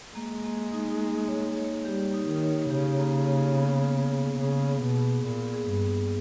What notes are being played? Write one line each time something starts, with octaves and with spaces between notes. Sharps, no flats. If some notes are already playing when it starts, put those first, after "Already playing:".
G#3 A#3
A#3
D#4
A#3
C#5
C#5
G3 G4
D#4
D#3
C#5
C#3 G4
A#3
A#3
B3
B3
G#4
C#3 G#4
B3
B2
G#4
A#2 B3
G#4
G2
B3